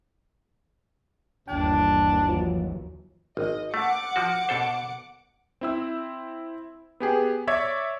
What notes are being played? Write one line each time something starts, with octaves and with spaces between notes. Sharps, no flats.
G1 D#2 E3 D4 G5
F3 F#3
G#1 D#5
A3 F#5 D6 C#7
F3 F#4
B2 A4 C5
C4 E4 E6
B3 G4 G#4
C#5 D5 E5 C#6 G#6